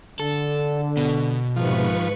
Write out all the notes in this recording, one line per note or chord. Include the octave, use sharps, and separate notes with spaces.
D3 A4
B2
F2 G#2 C3 D#3 F3 B4 C#6